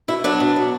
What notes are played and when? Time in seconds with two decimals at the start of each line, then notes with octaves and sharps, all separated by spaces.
0.08 B2 E4
0.24 F#3 D4
0.40 B2
0.56 F#3